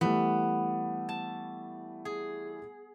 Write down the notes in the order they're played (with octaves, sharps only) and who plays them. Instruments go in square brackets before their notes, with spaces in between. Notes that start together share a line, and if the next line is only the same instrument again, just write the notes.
[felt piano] E3 G3 A3 [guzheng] B3
[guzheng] A5
G#4